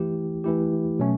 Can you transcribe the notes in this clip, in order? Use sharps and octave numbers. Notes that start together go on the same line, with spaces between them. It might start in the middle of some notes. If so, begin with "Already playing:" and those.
Already playing: E3 A3 E4 G4
E3 A3 E4 G4
B2 F#3 A3 C#4